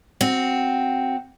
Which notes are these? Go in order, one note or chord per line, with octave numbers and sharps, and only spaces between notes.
C4 F#4